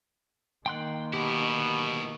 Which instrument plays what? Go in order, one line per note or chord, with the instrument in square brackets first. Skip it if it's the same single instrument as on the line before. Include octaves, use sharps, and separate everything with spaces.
[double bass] D#3 A#3 [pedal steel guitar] G5 C6 F#6
[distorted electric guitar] D2 E4 [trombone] B2 [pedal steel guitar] G4